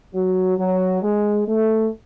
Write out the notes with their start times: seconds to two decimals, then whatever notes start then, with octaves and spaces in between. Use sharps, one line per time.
0.14 F#3
0.58 F#3
1.02 G#3
1.47 A3